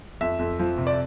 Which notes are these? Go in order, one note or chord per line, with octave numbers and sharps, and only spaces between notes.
F2 E5
F2
F3
C3
D5